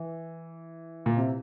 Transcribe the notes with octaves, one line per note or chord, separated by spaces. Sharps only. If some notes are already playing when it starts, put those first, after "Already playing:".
Already playing: E3
A#2
C3